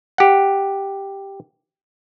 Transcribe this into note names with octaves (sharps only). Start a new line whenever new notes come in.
G4 F#5